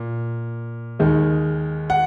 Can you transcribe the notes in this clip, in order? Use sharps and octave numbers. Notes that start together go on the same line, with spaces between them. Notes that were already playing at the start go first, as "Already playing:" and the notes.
Already playing: A#2
D#2 D#3 G#3
F#5